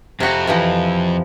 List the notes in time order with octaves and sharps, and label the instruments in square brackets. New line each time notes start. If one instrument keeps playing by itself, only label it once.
[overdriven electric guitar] F2 [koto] C3 F#4
[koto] C3 E3 F3